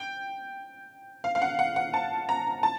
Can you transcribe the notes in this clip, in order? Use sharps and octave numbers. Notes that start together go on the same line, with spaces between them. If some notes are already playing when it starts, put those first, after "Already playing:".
Already playing: G5
F5
F5
F#5
F#5
F#5
A5
A#5
A5